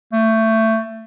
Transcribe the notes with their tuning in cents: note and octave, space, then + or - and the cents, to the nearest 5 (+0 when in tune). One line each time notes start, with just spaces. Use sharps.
A3 +20